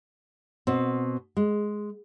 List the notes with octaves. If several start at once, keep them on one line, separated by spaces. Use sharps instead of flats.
B2 C4
G#3